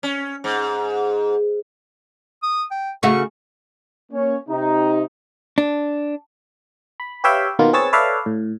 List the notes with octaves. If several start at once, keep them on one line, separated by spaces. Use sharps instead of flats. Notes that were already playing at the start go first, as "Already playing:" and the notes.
C#4
G#2
D#6
G5
C#3 A3 F#4 C#6
A#3 C#4 C#5
C3 D#4
D4
B5
G4 B4 C#5 E5 F5 G5
B2 D#3 A#3 B3 F4
C4 G#4 B4 C#5 E6 A6
A4 B4 C#5 D5 E5 F5
A2